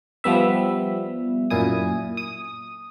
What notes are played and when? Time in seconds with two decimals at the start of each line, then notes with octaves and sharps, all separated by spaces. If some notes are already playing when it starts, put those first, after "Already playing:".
0.24 F3 G3 B3 E5
1.50 F#2 A#2 E4 G#5 D#6
2.17 D#6